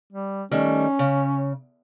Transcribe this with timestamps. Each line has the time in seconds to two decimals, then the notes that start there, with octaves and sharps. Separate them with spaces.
0.12 G3
0.51 D#3 G3 A3 C#4
0.99 C#3